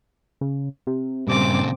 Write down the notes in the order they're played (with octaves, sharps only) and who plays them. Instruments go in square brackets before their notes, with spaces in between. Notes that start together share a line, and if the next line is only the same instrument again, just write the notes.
[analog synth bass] C#3
C3
[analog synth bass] G2 [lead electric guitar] A#2 C#3 [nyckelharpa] C4 D6